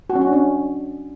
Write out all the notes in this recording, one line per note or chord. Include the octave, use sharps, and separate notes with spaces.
F#4
C#4
F#4
D4
C#4